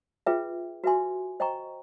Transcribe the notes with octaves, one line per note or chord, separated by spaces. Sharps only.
F4 G#4 B4 E5 G5
F#4 B4 E5 G#5 C6
C5 D#5 G5 A#5 C#6